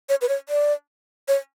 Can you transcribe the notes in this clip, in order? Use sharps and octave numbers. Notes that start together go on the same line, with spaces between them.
C#5
B4
C#5
D5
C#5